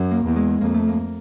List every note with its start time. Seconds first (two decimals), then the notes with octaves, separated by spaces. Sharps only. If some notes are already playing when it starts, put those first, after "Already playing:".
Already playing: F#2
0.11 A#3
0.24 E2
0.36 G#3
0.61 F2 A#3
0.74 A3
0.87 A#3